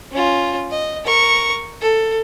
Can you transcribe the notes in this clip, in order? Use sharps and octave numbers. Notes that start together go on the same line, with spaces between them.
C#4 F4
D#5
A#4 C#6
A4